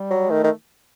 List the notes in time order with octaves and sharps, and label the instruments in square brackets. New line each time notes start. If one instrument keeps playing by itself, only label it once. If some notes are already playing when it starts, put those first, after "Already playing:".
Already playing: [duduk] G3
[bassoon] F#3
[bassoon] D#3 [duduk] A3
[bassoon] D#3